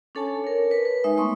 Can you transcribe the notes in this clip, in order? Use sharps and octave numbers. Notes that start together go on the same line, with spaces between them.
C#4 D4 A4 C#5 G#5 A5
A#4 C#5
B4
B4
G#3 D#4 E5
A3 B3 C6 C#6 D#6